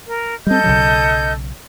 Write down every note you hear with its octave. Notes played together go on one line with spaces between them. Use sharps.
A#4
G3 C4 A4 D#5 G6
B1 C#3 F#3